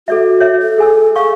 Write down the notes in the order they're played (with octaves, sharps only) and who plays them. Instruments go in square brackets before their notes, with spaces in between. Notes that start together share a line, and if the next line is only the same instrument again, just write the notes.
[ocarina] F#4 [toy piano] A4 D5 E5
[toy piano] C#5 E5
[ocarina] A4
[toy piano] G#4 G#5 E6
[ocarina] A4 [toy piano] F5 C#6